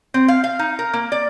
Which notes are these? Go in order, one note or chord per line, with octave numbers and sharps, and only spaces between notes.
C4
F5
F5
D#4
A#4
A#3
D5